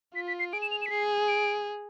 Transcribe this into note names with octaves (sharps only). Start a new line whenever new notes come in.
F4 B6
B6
C7
G#4 D7
E7
F7
E7
B6
G#4 C7
D7